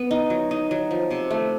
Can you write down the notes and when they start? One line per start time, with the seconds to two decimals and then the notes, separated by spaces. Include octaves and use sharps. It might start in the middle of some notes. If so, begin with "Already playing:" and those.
Already playing: B3
0.11 D#4
0.30 F#3
0.51 D#4
0.71 F#3
0.91 F3
1.11 C3
1.31 A3